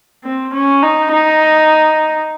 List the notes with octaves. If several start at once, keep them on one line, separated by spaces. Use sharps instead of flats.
C4
C#4
D#4
D#4